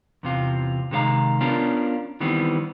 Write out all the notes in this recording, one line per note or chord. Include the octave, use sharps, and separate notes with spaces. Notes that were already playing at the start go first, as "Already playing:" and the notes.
E2 C3 F4
C3 D#3 G#3 C#5 F5 A#5
B3 C#4 D4 F4 A#4
D#3 E3 G3 B3 C4